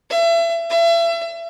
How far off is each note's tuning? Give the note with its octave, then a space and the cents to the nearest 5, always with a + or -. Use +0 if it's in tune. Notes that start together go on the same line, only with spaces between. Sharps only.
E5 +35
E5 +35